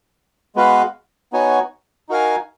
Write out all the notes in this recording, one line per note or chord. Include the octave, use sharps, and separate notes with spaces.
G#3 B3 F#4 B4 F5
B3 D#4 F#4 C#5 G#5
D#4 F#4 A#4 F5 G#5